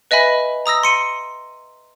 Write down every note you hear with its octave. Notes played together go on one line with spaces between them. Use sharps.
B4 D#5 E5 G#5 B5
A#5 D#6 E6 A#6
C6 C#7 D#7